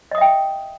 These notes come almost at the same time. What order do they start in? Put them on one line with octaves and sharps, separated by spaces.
D#5 D#6 E5 G5